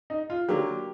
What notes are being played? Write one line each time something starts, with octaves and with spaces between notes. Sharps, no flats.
D#4
F4
D3 F#3 A#3 G4